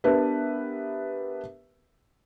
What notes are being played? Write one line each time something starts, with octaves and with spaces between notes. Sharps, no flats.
B3 D4 G4 A#4 B4 E5